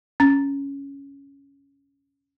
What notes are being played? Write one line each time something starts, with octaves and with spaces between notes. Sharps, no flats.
C#4 A#5 A6